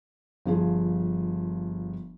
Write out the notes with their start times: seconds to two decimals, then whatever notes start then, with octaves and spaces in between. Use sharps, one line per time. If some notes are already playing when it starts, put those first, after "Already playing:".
0.46 G1 F3 G#4